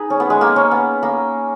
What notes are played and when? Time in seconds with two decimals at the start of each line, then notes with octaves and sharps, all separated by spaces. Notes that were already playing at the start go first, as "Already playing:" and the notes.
Already playing: D#4 G#4 B4
0.10 C#4
0.20 B3
0.30 G#3
0.41 A#3
0.56 C#4
0.71 B3
1.03 A#3